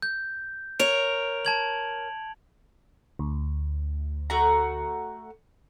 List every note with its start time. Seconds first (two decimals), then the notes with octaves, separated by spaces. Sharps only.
0.02 G6
0.79 A#4 C#5 D7 F7
1.45 A5 G#6 F#7
3.19 D2
4.30 A3 F#4 A#5